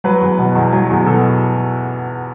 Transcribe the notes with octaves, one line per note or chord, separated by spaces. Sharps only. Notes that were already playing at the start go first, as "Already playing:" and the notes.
F#3 B4
E2
B2
E2
F#3
E2
B2 A4